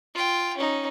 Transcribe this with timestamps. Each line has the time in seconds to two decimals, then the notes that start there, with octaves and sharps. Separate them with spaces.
0.15 F4 G5
0.57 C#4 D#4